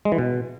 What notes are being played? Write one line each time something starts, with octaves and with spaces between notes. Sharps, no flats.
G#3
E3
B2